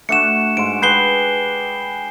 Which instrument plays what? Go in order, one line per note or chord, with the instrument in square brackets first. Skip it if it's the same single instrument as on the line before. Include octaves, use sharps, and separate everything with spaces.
[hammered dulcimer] A3 D4 F#4 [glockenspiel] C#7 E7
[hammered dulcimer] G#2 C6 [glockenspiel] D7
[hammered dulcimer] G4 G#4 B4 [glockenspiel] G6 C7 G7